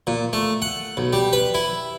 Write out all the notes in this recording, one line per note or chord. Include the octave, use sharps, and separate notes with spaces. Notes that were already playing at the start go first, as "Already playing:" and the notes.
A#2
A3
F#5
B1
G3
B4
E4